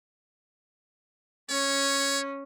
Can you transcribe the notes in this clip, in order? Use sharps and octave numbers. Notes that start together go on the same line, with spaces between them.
C#4 C#5